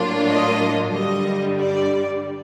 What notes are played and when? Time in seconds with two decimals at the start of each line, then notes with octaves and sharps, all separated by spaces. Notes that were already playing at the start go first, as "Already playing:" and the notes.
Already playing: A2 F#3 A#3 D4 F4
0.27 D#5
0.93 G2 D3 G3 D#5
1.60 D5